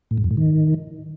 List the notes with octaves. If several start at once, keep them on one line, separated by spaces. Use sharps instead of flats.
A2
G#2
F2
A2
D#3